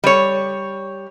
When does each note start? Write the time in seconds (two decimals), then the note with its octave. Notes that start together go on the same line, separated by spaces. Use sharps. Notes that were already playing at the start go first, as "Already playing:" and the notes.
0.04 G3 C#5